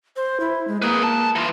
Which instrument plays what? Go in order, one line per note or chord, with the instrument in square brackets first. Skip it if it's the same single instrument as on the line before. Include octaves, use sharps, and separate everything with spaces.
[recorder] C5
E4
G#3
[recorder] A#3 [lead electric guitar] G#4 B4
[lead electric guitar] A5
E3 F4